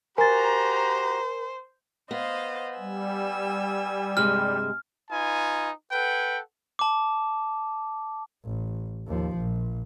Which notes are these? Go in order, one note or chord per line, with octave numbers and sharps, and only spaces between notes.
F#4 G4 A#4 C5 G#5 A#5 A6
B3 C5 D#5 F5
G3 G#5 E6
G2 C3 G#3 F6
D#4 F4 B4 G#5
A4 B4 F#5 G5
A5 D6
A1
D#2 F3
A#1